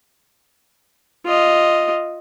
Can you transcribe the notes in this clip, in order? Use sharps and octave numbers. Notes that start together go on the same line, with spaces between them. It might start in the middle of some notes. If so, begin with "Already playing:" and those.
F4 D#5